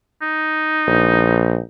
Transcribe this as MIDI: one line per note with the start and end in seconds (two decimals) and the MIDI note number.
0.22 1.67 63
0.87 1.59 34